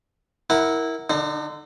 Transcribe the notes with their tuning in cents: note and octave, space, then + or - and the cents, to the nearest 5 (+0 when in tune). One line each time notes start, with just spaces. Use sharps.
E4 -15 A#4 +0 F#5 +5
D3 +0 D#4 -40